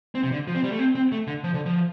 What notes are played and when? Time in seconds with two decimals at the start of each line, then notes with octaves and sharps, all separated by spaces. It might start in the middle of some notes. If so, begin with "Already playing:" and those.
0.15 C4
0.23 C3
0.32 D3
0.47 F3
0.55 C4
0.64 G3
0.71 A3
0.79 C4
0.95 C4
1.12 A3
1.27 D3
1.44 F3
1.54 D3
1.65 F3